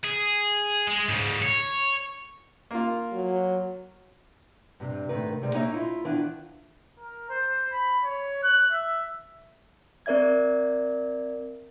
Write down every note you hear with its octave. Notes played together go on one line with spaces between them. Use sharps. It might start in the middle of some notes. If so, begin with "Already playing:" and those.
G#4
G#3
G#2 C#3
C#5
A#3 F4
F#3
G2 C3
G#2 C3 D#3 A3 D#4 B4
C3 G3 G#3
A#3 C#4 D#4 C#5 D#5 E5
E4 F4
D#3 E3 B3 D4 E4 F4
A#4
C5
B5
C#5
F#6
E5
C4 A#4 D5 E5 G#6